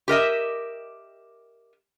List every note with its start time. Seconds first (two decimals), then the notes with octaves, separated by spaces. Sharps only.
0.08 G4 A#4 D#5 E5